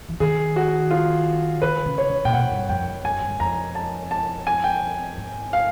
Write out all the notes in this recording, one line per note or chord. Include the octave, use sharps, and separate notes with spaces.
E3
D#3 G#4
F#4
F4
D#3 B4
C#3
C#5
C#3
A#2 G5
B2 F#5
G2
F2 G5
F#2 G#5
G2
F#2
F2 A#5
A5
A5
G#5
G5
G#2
F5